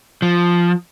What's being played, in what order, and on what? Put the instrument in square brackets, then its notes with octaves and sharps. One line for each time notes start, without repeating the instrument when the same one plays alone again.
[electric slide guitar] F3